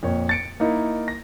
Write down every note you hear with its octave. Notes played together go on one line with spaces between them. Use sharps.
F2 A#2 C#5
A6 C#7 D7
A#3 D#4 E4
A#6